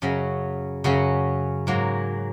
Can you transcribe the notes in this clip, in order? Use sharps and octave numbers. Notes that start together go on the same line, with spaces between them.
F#2 C#3 F#3 C#4
F#2 C#3 F#3 C#4
G#2 F#3 A#3